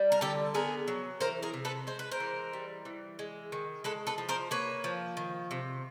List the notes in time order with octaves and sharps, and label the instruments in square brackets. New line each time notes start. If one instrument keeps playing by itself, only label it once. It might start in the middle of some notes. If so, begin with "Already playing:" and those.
Already playing: [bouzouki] G3
A#4
D3 G4 A4
B3 G#4 A#4
F#3
E3 A#4 C5
G#4 A#4
C3
A4 B4
G#3 C5
B4
A#4 C5
E3
G3
E3
G#3
D#3
G#3 A4 B4
A4 B4
F3
A#4 C5
A#3 B4 C#5
F3
D#3
C3